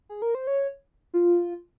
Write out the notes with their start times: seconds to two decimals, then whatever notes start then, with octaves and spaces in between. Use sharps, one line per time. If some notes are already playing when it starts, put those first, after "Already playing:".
0.09 G#4
0.22 A#4
0.35 C5
0.47 C#5
1.14 F4